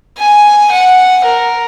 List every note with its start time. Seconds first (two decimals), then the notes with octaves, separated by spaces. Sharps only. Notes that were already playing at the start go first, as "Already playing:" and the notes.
0.19 G#5
0.72 F#5
1.25 A#4